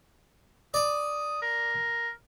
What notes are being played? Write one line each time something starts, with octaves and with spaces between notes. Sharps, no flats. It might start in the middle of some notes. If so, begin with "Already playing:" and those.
D5 D#6
A#4